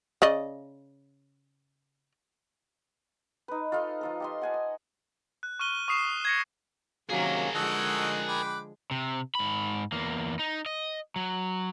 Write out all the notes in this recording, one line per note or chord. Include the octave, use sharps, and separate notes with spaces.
C#3 D5 D#5
D#4 B4
F4 A4 D#5 F5
F3 F4 A4
G4 D#5 C6
F#5 G#5 A5
G#5
F#6
C#6 F6 D#7 G7
C#6 D#6 C7 E7
G#6 A#6 C#7
C3 D#3 F#3 A#3 C#4 G#4 A#4
D3 F3 G#3 D#4 F#4 A4 F#6
G5 B5 D6
C3
G#2 B5
E2 A#3
D#4
D#5
F#3